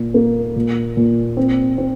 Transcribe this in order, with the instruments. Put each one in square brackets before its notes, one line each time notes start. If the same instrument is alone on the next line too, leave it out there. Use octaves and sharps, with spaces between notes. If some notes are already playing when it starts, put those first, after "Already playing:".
Already playing: [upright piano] A#2
A#3
A#2
A#2
C4
C4